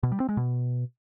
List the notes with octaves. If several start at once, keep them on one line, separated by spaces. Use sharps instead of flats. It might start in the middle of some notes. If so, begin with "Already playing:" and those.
B2
G3
C4
G#3
B2